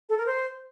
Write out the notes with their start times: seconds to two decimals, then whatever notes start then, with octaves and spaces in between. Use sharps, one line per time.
0.09 A4
0.18 A#4
0.26 C5